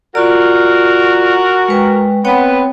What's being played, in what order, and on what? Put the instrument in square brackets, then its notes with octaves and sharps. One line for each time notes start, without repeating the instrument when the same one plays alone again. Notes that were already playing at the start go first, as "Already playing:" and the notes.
[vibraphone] F4 D5 [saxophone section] F#4 A#4
[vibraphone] G#3 B4 G5
[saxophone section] B3 B4 [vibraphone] C4 C#5 G5